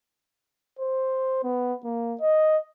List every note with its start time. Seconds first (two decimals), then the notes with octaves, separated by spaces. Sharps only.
0.79 C5
1.43 B3
1.84 A#3
2.20 D#5